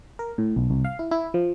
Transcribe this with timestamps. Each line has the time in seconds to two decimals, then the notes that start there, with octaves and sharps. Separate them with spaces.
0.19 A#4
0.38 A2
0.56 B1
0.70 C2
0.85 F5
0.99 E4
1.11 E4
1.34 F3